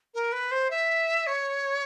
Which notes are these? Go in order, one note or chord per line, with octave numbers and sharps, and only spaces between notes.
A#4
B4
C5
E5
C#5